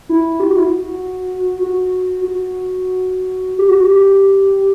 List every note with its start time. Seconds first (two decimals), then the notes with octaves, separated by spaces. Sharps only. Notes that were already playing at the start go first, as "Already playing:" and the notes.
0.09 E4
0.40 G4
0.49 F#4
0.56 E4
0.65 F#4
1.63 F#4
2.25 F#4
3.59 G4
3.70 F#4
3.80 G4